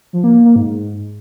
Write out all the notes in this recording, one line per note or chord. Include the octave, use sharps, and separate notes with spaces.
F3
A#3
A#3
A#3
G#2